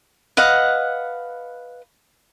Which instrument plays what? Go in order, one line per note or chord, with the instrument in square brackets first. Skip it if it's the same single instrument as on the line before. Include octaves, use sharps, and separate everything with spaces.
[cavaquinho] B4 D#5 F5 F#5